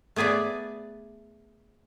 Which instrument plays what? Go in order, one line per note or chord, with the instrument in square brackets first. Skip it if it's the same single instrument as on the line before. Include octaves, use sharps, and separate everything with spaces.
[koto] A3 B3 G#4 B4 D5